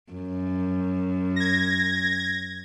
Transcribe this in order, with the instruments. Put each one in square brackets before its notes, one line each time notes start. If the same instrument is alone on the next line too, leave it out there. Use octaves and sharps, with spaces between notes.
[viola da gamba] F#2
[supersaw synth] G#6 A#6